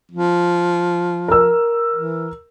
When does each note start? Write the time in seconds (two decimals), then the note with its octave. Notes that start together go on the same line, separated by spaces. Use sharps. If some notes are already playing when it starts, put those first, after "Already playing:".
0.11 F3
1.28 A#4 E6
1.95 E3